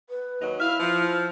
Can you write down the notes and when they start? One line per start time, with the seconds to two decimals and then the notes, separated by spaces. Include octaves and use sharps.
0.10 B4
0.41 D#2 F#3 D#4
0.60 E4 E5 F5 F6
0.79 F3